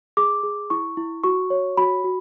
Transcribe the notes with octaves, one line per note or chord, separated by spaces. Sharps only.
G#4 D6
G#4
E4 C#6
E4
F#4 C#6
C#5
F#4 B5
F#4